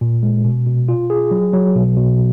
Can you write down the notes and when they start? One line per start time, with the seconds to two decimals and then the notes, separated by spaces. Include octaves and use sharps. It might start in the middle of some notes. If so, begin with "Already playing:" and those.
0.01 A#2
0.23 G#3
0.44 B2
0.66 B2
0.89 F4
1.10 G#4
1.31 F#3
1.53 F#3
1.76 B2
1.97 B2